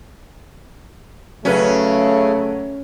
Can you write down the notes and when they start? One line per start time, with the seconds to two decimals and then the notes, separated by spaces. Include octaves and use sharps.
1.45 C#3 F#3 A3 C#4 B4